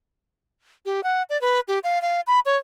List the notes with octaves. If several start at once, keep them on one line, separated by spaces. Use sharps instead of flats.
G4
F#5
D5
B4
G4
F5
F5
B5
C#5